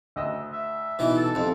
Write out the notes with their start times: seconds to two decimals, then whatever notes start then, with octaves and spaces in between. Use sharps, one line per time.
0.16 D2 D#5 E6
0.53 E5
0.99 B2 E3 D#4
1.16 A4
1.35 F2 C3 F3